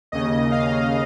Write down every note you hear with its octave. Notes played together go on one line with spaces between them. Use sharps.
D#2 C#3 D#5
F5